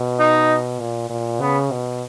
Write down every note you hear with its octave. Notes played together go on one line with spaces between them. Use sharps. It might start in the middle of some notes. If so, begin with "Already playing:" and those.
Already playing: B2
D#4
A#2
A#2
C#3 B3
B2